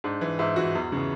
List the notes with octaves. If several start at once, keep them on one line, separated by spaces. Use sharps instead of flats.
G#2 D4
E3
G#2 E4
E3 F#4
E2
C#3 E3